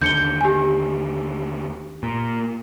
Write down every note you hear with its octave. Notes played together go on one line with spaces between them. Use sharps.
D#2 D3 G6 C#7 G7
G4 G#5
A#2